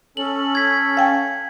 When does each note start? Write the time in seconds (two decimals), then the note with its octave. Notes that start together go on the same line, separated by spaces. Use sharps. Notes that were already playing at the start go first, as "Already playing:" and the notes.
0.17 C#4 A4 F#7
0.55 G#6 B6
0.97 F5 G5 G#5